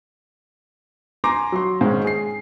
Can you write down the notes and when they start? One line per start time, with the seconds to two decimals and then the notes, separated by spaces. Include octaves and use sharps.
1.24 G#5 A#5 C6 D6 A#6
1.52 F#3 C6
1.81 G#2 D#3 G#3 C#4
2.04 G#4 C7